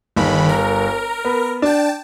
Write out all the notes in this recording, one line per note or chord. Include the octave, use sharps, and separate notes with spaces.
G1 D#3 B5
A#4
B3
D4 G5 A5